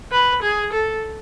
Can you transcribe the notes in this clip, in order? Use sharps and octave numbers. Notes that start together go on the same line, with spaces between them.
B4
G#4
A4